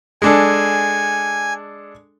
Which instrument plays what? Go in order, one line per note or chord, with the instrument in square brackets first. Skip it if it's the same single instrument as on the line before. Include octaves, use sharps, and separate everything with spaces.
[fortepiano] G#3 D4 A4 [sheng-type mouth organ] G#5